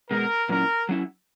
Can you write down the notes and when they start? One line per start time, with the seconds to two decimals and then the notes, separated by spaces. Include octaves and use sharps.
0.10 B2 G#3 B3 A#4
0.49 A#2 F#3 C#4 E4 A#4
0.89 F#3 C#4 E4